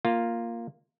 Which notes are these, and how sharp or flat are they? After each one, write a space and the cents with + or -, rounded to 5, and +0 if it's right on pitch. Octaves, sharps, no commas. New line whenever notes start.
A#3 +0 F4 +0